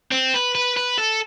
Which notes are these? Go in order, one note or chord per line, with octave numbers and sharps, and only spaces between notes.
C4
B4
B4
B4
A4